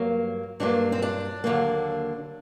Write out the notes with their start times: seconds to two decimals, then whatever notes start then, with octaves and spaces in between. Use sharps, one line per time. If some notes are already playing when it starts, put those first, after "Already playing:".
Already playing: G2 F#3 A#3
0.60 G2 F#3 A#3 D4
0.92 C4
1.02 D4
1.44 D#2 D3 F#3 A#3